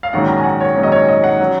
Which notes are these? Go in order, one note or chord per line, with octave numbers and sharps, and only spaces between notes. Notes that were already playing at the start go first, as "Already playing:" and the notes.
F5
A#1 G#2 D#3 F#3 C#4 F#5
A#5
G#5
F#5
C#5
A#1 G#2 D#3 F#3 C#4
D#5
C#5
D#5
F#5
F#3 C#4